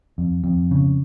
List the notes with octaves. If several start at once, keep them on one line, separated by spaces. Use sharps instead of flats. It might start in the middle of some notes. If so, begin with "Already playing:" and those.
F2
F2
C#3